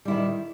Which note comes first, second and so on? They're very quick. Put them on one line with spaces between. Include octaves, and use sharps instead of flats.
G3 E4 D#3